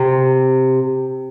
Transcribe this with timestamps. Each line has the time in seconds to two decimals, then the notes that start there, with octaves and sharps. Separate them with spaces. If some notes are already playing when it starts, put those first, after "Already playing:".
Already playing: C3